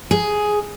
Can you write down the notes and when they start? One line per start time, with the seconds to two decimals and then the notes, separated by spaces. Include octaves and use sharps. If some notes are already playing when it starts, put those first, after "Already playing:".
0.11 G#4